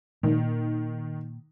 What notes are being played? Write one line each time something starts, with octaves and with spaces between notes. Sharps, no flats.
A#2 D#3